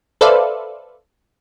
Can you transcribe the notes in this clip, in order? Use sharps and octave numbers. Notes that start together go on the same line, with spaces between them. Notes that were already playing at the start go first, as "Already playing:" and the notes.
A4 B4 C5 D5 E5 F5